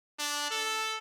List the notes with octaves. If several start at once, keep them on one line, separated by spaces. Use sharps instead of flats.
D4
A4